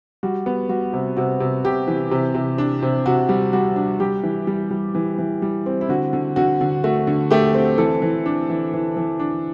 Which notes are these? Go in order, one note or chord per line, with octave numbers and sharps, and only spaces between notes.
G3 F#4
B3
G3 F#4
C3
C3 F#4
C3
C3 G4
E3
C3
C3
D4
C3
C3 F#4
G3
G3 F#4
D4
G3 G4
E3
G3
G3
E3
E3
G3
C4
E4
D3 F#4
D3
D3 F#4
D3
A3 F#4
D3
A3 G4
C4
E3 A4
E3
D4
E3
E3
E3
D4